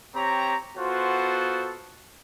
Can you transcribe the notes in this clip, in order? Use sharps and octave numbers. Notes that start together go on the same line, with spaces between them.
C4 G4 C#5 A#5
B3 F4 F#4 A4 C5 F#5